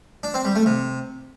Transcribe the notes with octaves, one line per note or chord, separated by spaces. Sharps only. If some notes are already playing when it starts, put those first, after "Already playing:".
D4
C4
G3
A3
C3